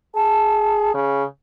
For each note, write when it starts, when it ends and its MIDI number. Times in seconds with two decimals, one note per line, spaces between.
0.15 0.91 68
0.15 0.91 81
0.94 1.23 49